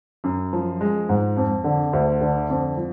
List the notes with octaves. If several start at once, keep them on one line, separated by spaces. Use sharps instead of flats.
F#2
F3
G#3
G#2
F2
D3
D2
D3
F2
F3